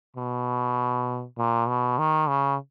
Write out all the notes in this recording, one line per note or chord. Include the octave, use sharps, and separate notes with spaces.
B2
A#2
B2
D#3
C#3